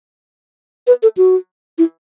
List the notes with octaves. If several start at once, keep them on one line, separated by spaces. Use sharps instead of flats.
B4
A4
F#4
E4